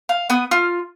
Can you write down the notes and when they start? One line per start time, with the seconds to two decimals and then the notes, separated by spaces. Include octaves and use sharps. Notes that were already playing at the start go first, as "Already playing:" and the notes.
0.09 F5
0.30 B3 D#6
0.51 F4 F6